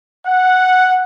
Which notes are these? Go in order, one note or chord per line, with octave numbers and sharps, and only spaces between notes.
F#5